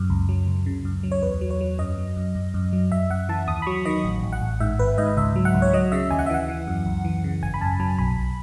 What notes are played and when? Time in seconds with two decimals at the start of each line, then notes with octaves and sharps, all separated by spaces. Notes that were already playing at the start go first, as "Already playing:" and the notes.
Already playing: F#2
0.10 C#2
0.29 F#3
0.47 C#2
0.66 C#3
0.85 F#2
1.03 F#3
1.12 C#5
1.22 E2 B4
1.41 F#3
1.50 C#5
1.61 F#3
1.79 F#2 D#5
1.98 F#3
2.17 F#2
2.35 F#2
2.54 F#2
2.73 F#3
2.92 F#2 E5
3.10 F#2 F#5
3.29 E3 A5
3.47 D#2 D#6
3.62 B5
3.67 F#3 C#6
3.85 D#3 D#5
4.04 A1
4.23 A1
4.32 F#5
4.42 A1
4.60 G#2 E5
4.79 G#1 B4
4.98 G#2 D#5
5.17 C#2 E5
5.36 F#3
5.45 F#5
5.54 C#2
5.62 C#5
5.73 F#3 D#5
5.92 C#3 E5
6.11 D#2 G#5
6.19 F#5
6.26 E5
6.30 E3 F#5
6.49 E3
6.67 F#2
6.86 C#2
7.05 E3
7.24 C#3
7.43 G#1 G#5
7.54 B5
7.61 F#2 A5
7.80 F#3 A5
7.99 B1 B5
8.17 B1